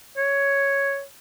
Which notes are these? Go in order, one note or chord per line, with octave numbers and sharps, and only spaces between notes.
C#5